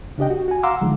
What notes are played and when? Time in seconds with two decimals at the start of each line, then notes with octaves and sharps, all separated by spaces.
0.18 C#3 D4 G4 D#5 G5
0.30 F#4
0.48 F#4 G#5
0.63 F5 F#5 A#5 C6 D6 E6
0.81 D3 D#3 F3 G#3